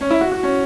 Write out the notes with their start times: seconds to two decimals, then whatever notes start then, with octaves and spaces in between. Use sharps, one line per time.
0.01 C#4
0.10 E4
0.21 F#4
0.32 F#4
0.43 C#4